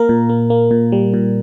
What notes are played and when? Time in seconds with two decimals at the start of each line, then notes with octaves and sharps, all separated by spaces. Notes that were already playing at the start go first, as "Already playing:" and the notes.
Already playing: A#3 A#4
0.09 A#2
0.29 A#3
0.50 A#3
0.71 A#2
0.92 G3
1.14 A#2